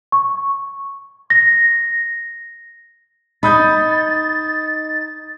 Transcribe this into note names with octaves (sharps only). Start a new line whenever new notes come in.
C#6
A#6
D#4 B5 D#6 G6 A6